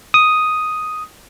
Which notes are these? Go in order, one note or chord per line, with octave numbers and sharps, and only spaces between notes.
D#6